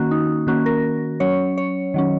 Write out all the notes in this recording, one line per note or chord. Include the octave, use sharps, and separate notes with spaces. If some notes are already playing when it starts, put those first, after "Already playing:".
Already playing: D#3 A#3 C#4 F#4
D#4
D#3 A#3 C#4 F#4
A#4
F#3 C#4 C#5
C#5
D#3 F#3 C#4